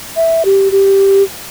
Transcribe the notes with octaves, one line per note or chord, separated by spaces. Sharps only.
E5
G4
G4